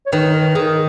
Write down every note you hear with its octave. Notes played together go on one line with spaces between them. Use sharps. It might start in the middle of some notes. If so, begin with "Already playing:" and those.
C#5
D#3 B4
A#4
D#3 G#4